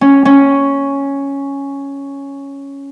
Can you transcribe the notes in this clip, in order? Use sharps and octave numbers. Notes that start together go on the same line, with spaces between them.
C#4
C#4